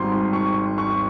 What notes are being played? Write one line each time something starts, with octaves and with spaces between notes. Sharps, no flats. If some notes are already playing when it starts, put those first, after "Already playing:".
Already playing: G#1 G#2 G3 C6
C#6
C#6